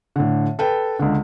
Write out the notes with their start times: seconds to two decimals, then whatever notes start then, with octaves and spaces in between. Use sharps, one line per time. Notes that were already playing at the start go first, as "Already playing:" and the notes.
0.16 A2 D3
0.59 A4 B4 G5
0.99 C#2 D3